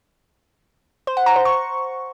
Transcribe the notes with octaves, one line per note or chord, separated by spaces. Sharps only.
C5
F#5
A#5
C5
C#6